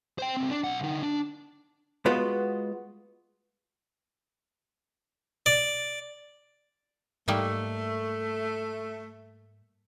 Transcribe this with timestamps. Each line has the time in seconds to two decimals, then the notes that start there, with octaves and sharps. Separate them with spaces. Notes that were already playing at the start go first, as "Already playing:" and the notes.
0.18 C5 G5
0.37 C#2 C4
0.51 D4
0.64 B1 F#5
0.83 D3 D#4
1.03 D4
2.06 G#3 B3 F4 F#4
5.46 D5
7.28 G#2 G3 A3 A#3 D#4